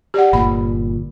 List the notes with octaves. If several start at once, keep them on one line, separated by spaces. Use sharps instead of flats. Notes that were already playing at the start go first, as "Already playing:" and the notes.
G4 D5 F#5
G1 A#2 B5